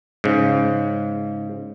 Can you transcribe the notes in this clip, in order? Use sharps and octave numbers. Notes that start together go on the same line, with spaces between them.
G#2 C#3